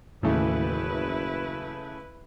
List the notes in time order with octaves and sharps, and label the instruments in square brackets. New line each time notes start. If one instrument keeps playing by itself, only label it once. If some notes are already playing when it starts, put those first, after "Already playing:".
[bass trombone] F#1 [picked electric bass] D#2 A2 [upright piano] C#3 E3 A3 [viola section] E4 B4